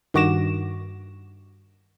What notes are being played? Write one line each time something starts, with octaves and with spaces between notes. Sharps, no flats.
G2 D#3 F#4 D6 A#6 E7